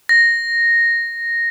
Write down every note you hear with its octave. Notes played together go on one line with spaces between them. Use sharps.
A#6